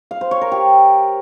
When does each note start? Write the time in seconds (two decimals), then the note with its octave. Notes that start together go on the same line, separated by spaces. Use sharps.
0.11 F5
0.21 C5
0.31 C#5
0.41 A#4
0.52 G4